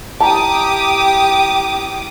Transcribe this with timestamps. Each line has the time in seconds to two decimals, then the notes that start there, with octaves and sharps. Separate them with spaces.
0.20 E4 G4 A5 A#5 D6 D#6